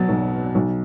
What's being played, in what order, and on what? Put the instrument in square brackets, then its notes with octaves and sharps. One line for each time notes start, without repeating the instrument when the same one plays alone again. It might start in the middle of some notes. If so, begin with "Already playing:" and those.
Already playing: [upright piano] B2 F#3 A6
B1
B1